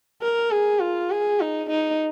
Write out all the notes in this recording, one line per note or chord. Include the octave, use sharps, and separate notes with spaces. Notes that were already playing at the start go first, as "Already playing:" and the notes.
A#4
G#4
F4
G#4
D#4
D#4